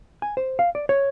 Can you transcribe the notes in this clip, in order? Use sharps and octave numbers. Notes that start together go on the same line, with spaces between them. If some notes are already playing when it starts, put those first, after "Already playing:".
G#5
C5
F5
D5
C#5